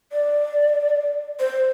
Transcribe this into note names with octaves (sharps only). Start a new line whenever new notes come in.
D5
C5